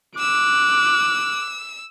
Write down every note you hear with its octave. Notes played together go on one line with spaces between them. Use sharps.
D6 E6 F#6